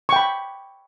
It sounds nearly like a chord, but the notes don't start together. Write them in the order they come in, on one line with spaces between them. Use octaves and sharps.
C#6 G5 B5